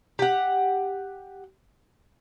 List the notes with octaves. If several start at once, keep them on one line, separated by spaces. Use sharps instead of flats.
G4 F#5